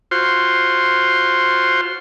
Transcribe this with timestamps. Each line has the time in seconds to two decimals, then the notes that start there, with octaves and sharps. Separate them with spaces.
0.11 F4 F#4 C5 C6